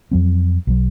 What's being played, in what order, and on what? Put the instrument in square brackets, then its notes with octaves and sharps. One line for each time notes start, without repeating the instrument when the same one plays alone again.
[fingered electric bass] F2 F#3 C4
B1 F#3